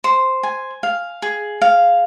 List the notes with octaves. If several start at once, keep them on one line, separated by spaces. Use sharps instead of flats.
C5
G#5
F5
G#4
F5